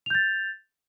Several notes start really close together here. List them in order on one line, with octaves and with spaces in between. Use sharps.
F7 G6 A6